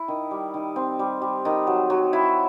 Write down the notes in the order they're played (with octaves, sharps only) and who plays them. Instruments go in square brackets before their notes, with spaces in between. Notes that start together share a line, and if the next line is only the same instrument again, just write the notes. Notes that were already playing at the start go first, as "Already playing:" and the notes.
Already playing: [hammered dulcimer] E4
D#3
G3
D#3
C4
G3
G3
D#3
F#3
F#3
E4